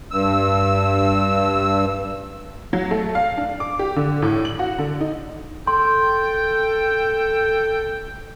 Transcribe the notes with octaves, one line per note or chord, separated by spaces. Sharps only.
G2 E6
F#3
A3
F5
D4
D6
G4
D3
A2
F#7
F#4
D3
D#4
A4 G5 C6